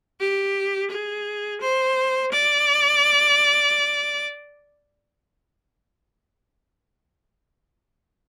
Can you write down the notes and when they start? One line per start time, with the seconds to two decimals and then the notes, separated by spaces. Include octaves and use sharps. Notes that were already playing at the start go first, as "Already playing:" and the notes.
0.20 G4
0.90 G#4
1.61 C5
2.32 D5